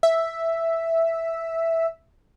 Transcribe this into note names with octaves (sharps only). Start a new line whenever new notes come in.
E5